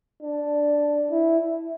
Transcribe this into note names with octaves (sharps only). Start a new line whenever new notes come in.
D4
E4